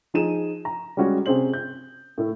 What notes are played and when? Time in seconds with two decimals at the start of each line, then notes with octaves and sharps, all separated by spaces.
0.14 F3 D#4 G#4 D#7 E7
0.65 A#5
0.97 G3 G#3 C#4 F#4 G4
1.26 C3 C#4 G#4 C5 F#7
1.53 G6
2.18 A2 A3